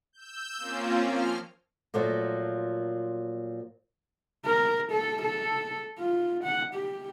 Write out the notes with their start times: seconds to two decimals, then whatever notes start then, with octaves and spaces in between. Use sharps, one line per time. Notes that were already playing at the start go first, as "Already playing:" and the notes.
0.13 E6 G6
0.58 A#3 C4 C#4 F4
1.01 F3 F6
1.94 A#2 F3 F#3 A3 A#3
4.45 A#4
4.92 A4
5.23 A4
5.99 F4
6.44 F#5
6.75 G4